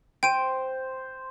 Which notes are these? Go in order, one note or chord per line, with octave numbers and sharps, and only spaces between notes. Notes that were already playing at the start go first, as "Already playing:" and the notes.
C5 G5 D7 D#7